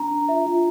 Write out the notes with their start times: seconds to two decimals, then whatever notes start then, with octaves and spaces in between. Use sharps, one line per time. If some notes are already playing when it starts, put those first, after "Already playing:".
Already playing: D4 A#5
0.10 D4
0.29 F4 E5
0.47 F4